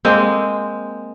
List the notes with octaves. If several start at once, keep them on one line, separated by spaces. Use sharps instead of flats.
G#3 A#3 C4